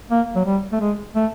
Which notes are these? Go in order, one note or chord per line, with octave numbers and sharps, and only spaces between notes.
A#3
F#3
G3
A3
G#3
A3